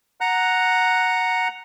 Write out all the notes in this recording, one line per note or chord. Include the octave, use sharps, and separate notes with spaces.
F#5 A#5 F#6